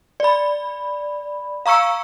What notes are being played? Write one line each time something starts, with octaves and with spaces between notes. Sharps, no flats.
D5 B5
F5 A#5 C#6 E6 C#7